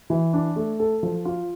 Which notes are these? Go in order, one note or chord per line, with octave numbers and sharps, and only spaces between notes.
E3
D4
A3
A4
F3
F4